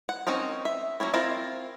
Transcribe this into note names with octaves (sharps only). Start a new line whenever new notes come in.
F#5
C4 C#4 D#4 A#4
E5
F#3 A#3 C#4 E4
C4 E4 F4 A#4